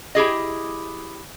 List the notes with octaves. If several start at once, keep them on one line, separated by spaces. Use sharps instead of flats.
E4 G4 G#4 D#5